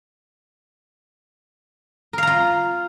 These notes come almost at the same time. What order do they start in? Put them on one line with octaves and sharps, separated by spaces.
A#4 F5 A#5 F4